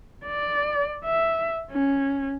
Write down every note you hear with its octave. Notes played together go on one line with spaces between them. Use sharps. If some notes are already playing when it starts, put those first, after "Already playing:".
D5
E5
C#4